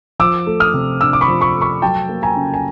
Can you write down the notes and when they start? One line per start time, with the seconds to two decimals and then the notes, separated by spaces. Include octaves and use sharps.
0.19 F3 D6 E6
0.47 A3
0.60 D#6 F6
0.74 C3
1.01 D4 D6 E6
1.13 D6
1.21 B5 C#6
1.28 F3
1.41 B5 C#6
1.55 A3
1.62 B5 C#6
1.82 F#3 G5 A5
2.09 A#3
2.23 G#5 A#5
2.36 C#3
2.54 G#5